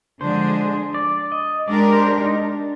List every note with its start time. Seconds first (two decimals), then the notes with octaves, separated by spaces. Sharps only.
0.20 D3 F3 G#3 D4 G#4 C5
0.94 D5
1.32 D#5
1.68 G#3 D4 G4 A#4 D5
1.93 C5
2.18 D#4
2.42 D4